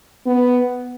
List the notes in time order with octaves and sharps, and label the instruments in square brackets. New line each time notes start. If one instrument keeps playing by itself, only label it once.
[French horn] B3